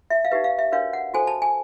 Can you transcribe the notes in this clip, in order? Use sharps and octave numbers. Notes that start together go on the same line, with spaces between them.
E5
F5
D#4 G4 B4 E5
F5
E5
D4 F#4 A#4 C#5 F5
F#5
F#4 A4 C5 G#5
A5
G#5